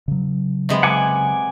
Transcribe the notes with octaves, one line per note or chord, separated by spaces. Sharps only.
C#3 F#3
C3 G#3 B3
F#5 G#5 D6